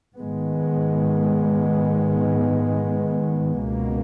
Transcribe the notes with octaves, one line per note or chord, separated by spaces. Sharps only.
G#2 D#3 G#3 B3
C#2 B2 A#3